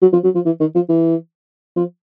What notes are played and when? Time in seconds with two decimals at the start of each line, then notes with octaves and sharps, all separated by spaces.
0.02 F#3
0.13 F3
0.24 F#3
0.35 F3
0.46 E3
0.60 D#3
0.75 F3
0.89 E3
1.76 F3